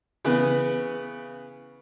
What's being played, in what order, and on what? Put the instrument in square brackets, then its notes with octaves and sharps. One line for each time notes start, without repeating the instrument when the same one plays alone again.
[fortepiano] C#3 E3 B3 B4